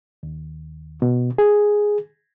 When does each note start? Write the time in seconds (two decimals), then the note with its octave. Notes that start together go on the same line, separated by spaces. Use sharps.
0.23 D#2
1.02 B2
1.38 G#4